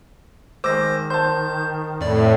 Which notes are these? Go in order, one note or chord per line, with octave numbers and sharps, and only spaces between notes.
D#3 G#3 C5 D6 E6 A#6
C5 A5 G6
F2 A2 D5